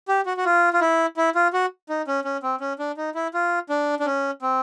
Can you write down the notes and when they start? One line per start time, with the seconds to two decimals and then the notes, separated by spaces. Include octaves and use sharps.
0.08 G4
0.26 F#4
0.37 F#4
0.45 F4
0.73 F4
0.81 E4
1.17 E4
1.35 F4
1.53 F#4
1.89 D#4
2.08 C#4
2.25 C#4
2.43 C4
2.61 C#4
2.79 D4
2.97 D#4
3.15 E4
3.34 F4
3.70 D4
4.00 D4
4.06 C#4
4.42 C4